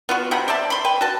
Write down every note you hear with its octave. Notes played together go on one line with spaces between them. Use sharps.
B3 F4 F#4
C3 C5 F#5 B5
C5 D5 E5 A5
B5 C6
B4 G5
F#4 A5